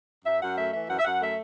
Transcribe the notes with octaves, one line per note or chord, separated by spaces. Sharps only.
F#2 E5
F#2 F#5
A3 E5
E3 E5
F#2 F#5
E5
F#2 F#5
A3 E5